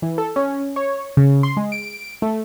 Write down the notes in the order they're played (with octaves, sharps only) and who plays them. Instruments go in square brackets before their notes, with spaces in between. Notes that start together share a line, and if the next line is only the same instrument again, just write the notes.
[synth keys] E3
A4
C#4
C#5
C#3
C6
G#3
D7
A3